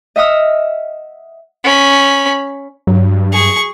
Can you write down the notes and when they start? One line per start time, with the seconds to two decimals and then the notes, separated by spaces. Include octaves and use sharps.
0.16 D#5 E5 F#5 D#6 F6
1.64 C#4 B5
2.87 G2 F#3
3.33 G#4 C#6